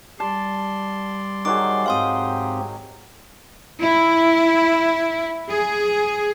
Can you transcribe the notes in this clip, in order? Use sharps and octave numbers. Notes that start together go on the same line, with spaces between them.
G3 D5 A5 C6
D#3 F#3 G#4 D6
G#2 C4 G4 F5 C6 D#6
E4
G#4